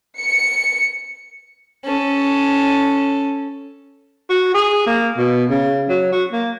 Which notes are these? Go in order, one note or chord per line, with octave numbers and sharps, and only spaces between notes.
C#7
C#4 A4
F#4
G#4
A#3
B2
C#3
F#3
F#4
A#3